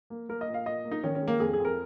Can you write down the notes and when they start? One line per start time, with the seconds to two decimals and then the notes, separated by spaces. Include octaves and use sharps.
0.10 A#3
0.29 A#3 A#4
0.41 D#5
0.48 A#2
0.54 F5
0.66 A#2 D#5
0.85 A#3
0.92 D#4
1.04 D#3 C#4
1.15 C#4
1.22 G#3
1.28 A#3
1.40 F2 G#4
1.53 G#4
1.60 F2 A#4